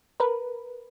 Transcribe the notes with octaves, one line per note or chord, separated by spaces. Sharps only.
A#4 B4